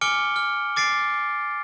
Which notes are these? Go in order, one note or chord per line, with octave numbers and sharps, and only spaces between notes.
G#5 D6 F6 C#7 D7 G7
F6
D6 A6 C7 D7